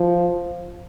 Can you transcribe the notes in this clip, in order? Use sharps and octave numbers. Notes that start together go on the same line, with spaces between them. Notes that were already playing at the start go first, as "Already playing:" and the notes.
Already playing: F3